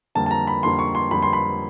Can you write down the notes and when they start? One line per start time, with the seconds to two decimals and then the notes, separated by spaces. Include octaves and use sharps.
0.15 F2 D3 G3 A#3 A5
0.26 A5
0.31 A#5
0.47 B5
0.63 F2 D3 G3 A#3 C6
0.79 C#6
0.95 C6
1.11 F2 D3 G3 A#3 B5
1.22 C6
1.33 B5